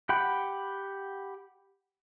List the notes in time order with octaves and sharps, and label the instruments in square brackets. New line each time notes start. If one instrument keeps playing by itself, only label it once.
[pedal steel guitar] G4 F#5 G5 B5